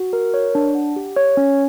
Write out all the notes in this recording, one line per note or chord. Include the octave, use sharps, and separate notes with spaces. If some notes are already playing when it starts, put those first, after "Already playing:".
Already playing: F#4
A#4
C#5
D4
F#5
G4
C#5
C#4